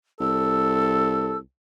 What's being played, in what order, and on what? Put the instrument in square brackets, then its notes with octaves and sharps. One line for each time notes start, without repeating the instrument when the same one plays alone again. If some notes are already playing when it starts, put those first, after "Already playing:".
[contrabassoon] C2 [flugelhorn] A4 [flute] E6